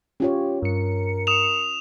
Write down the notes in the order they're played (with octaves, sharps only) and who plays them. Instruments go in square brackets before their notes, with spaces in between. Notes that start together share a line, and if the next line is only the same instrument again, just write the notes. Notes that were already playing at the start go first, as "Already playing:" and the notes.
[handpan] C#4 F4 C#5 [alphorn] G4
[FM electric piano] G2 C#7 [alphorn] A#4
[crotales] D#6 E7 F7